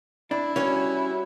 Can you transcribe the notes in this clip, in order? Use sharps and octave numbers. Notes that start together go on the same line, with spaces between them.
D4 E4
G3 C#4 F#4 C#5